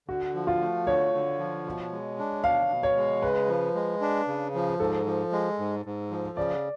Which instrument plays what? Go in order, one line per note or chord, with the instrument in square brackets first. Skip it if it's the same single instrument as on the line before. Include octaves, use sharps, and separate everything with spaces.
[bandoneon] D3 [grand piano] F#4
[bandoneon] F3
[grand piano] F4
[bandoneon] A3
[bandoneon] D3 [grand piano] C#5
[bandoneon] D3
F3
B2
G#3
D4
[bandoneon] B2 [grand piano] F5
[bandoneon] B2
[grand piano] C#5
[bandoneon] G#3
[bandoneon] C#3 [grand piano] B4
[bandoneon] F3
G#3
D4
C#3
F3
[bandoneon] G#2 [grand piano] A4
[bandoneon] F3
G#3
G#2
G#2
F3
[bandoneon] C#3 [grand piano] D5